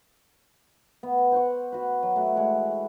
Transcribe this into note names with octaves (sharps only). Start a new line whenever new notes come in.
B3
C5 F#5 C#6
F#4 B4
F#3
A3 E4 F#4
G#3 E4 F#5 C#6